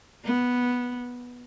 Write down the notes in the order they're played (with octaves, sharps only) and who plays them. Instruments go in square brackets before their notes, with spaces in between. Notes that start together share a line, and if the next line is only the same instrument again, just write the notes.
[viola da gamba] B3